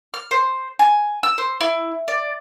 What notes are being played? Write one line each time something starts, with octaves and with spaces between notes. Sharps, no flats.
F6
C5
G#5
E6
C5
E4
D5